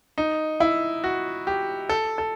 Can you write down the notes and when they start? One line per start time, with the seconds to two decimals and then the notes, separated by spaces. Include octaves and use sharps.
0.18 D#4
0.60 E4
1.04 F#4
1.47 G4
1.89 A4
2.18 A4